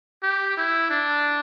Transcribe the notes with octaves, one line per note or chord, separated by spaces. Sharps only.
G4
E4
D4